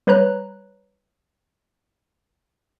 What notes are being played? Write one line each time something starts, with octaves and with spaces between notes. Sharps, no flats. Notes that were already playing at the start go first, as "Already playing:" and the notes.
G3 B4 C#5 A#5 F#6